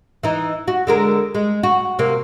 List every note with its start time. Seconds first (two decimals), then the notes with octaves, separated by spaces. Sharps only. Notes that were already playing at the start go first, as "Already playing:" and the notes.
0.23 E3 D#4
0.68 F#4
0.87 D3 G#3 A#4
1.35 G#3
1.63 F#4
1.99 C3 A#3